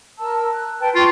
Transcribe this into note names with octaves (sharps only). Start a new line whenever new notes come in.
A#4 A5 E6
F#6
B4 G5 A5
F4 G5 C#6